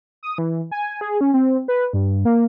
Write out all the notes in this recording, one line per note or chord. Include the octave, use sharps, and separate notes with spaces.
D#6
E3
G#5
G#4
C#4
C4
B4
G2
A#3